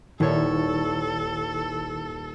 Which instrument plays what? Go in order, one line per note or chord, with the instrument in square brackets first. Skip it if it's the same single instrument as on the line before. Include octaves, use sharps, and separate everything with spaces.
[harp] D#1 C#5 [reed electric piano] D#3 E4 [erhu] A4